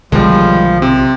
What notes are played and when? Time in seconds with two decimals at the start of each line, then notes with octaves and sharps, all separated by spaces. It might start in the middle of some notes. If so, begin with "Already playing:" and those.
0.12 B1 D3 D#3 F3 G3 G#3
0.82 C3